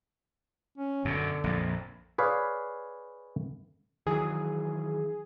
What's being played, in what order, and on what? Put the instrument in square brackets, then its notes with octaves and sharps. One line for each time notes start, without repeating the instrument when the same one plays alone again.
[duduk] C#4
[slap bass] F#2 B2 [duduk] D3
[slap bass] A#1 F2
[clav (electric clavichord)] G#4 B4 C#5 D5 F5
[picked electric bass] D#3 E3 F#3 [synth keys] G#4